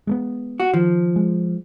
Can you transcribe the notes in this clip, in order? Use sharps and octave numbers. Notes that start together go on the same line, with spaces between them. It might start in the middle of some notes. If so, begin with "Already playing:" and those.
G#3 A#3 B3
F#4
D#3 F3
G#3